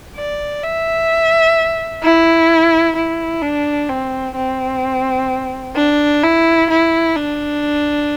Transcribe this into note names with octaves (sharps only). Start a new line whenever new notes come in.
D5
E5
E4
E4
D4
C4
C4
D4
E4
E4
D4